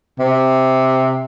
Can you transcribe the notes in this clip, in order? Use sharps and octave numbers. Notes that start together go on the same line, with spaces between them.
C3